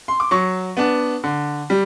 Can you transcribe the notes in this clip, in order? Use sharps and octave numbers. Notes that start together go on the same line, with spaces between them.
C6
D6
F#3 C#6
B3 D4
D3
G3